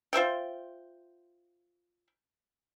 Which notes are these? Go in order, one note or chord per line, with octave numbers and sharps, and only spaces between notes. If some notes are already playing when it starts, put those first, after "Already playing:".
F4 C5 E5 G5